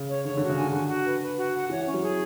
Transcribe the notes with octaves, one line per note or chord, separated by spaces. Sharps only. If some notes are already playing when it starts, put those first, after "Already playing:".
Already playing: C#3
C#5
D3 C#5
D3 F#4
C#3
D3 G#5
D3 F#4
F#4
B4
B4
F#4
F#5
E3 C#5
C#4
F#3
G#4